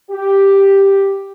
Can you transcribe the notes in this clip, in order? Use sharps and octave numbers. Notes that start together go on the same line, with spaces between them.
G4